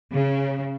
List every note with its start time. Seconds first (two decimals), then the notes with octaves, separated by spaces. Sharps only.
0.11 C#3